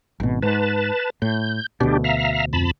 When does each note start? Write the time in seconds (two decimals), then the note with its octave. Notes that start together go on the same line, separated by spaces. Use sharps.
0.20 G#1 B2
0.42 G#2 B4 A5
1.22 A2 G6
1.80 D2 B2 D4 G4
2.04 E5 F5 A#5
2.53 F2 A5 B5